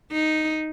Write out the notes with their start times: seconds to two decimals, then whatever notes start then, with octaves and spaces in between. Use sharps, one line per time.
0.12 D#4